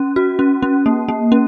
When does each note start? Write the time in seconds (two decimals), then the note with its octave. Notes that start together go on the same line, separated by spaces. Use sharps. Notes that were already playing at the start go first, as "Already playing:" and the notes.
Already playing: C#4
0.16 F#4
0.39 C#4
0.63 C#4
0.86 A#3
1.09 A#3
1.32 C#4